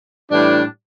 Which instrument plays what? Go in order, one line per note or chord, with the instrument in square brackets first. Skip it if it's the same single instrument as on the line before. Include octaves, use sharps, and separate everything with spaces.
[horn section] A2 E3 G3 D4